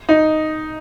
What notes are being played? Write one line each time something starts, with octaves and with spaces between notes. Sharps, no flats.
D#4